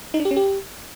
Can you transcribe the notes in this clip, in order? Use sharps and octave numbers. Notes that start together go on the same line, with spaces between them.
D#4
D4
G4
C#4
G4